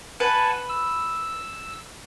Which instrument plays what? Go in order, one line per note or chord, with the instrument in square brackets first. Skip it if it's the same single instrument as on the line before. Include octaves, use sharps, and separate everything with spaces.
[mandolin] B4 [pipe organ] F#5 G#5 A5
[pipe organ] E6